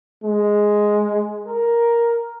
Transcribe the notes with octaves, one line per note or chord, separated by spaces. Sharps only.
G#3
A#4